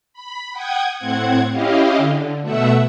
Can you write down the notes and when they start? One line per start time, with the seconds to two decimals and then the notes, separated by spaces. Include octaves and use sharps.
0.14 B5
0.52 F#5 G5 D#6 G#6
0.97 A2 C4 F#5 G#6
1.51 C#4 E4 G4 D#5 F5
1.97 D3
2.41 B2 A3 E5 F#5 E6